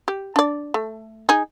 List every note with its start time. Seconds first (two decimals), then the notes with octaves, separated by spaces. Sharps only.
0.08 G4
0.36 D4 D5
0.74 A3
1.29 D#4 G#4